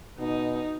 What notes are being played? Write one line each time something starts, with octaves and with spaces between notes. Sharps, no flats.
B2 D#4